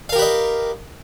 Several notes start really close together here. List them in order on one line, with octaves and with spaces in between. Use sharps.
F5 A#4 G4 B4 D#5